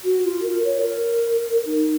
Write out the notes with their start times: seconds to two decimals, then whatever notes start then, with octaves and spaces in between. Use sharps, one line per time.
0.04 F#4
0.25 F4
0.43 A#4
0.64 C#5
0.81 A#4
1.66 D#4